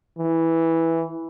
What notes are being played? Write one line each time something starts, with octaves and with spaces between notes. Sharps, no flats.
E3